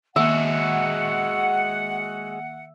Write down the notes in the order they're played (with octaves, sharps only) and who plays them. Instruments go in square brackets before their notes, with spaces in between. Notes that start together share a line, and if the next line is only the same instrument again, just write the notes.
[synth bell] D#3 A#3 [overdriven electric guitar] G#3 F#4 [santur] E5 [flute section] F#5